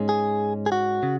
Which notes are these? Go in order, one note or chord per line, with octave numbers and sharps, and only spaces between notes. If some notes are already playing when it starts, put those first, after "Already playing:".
Already playing: G#2 G#3 C#4
G#4
G#4
F#4
C#3